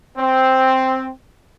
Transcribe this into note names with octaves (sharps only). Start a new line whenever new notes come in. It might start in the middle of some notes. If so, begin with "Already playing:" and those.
C4